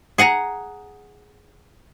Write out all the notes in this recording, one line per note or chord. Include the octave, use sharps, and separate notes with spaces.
G#4 F#5 G#5 A#5